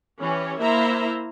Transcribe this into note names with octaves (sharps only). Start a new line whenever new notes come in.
E3 C#4 G4 C#5
A#3 E4 C5 E5 A#5